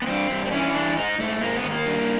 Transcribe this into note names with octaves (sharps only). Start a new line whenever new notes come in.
B3
G2 C4
G2
C4
E3 C#4
G2 D4
G#2 D#4
G#2 A3
G#2 A#3
B3
D#3
A#3
G2